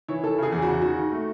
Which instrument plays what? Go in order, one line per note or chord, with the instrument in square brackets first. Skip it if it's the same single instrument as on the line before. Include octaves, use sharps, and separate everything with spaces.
[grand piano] E3 [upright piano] C#5
[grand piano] E3 [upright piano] A4
[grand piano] C#3 [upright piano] G#4
[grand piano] E2
[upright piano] F#4
[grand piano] C#3
[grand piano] D#3 [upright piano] F#4
[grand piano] D#3
A3